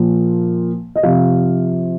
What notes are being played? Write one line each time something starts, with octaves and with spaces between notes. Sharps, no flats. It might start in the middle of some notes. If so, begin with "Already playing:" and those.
Already playing: A#2 F3
D#5
C3 F3 F5